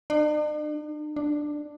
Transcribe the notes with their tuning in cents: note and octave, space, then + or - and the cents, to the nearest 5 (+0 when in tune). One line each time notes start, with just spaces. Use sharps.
D4 +45
D4 +10